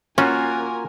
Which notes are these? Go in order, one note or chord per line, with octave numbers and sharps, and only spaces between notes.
A#3 C#4 F4 F#4 A#4 G#5